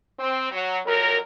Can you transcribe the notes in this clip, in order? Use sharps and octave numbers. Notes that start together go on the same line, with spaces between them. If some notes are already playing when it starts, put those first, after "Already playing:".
C4
F#3
F2 F#3 A#4